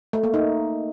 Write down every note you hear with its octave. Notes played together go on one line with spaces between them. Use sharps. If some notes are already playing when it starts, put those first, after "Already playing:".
A3
A#3
D#4